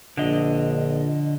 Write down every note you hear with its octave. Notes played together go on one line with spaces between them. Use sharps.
A#1 D3 D#5